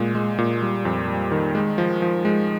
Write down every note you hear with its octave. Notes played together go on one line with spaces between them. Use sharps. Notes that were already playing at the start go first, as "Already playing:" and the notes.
Already playing: A#2 G#3
G#3
A#2
G3
F2
G3
D#3
G#3
F3
F3
G#3